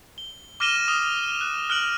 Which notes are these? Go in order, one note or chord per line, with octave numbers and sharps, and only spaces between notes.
G7
D6 F6 A#6 D#7 E7 G7
D#6 F6
F#6
F6 F#6 D7 F#7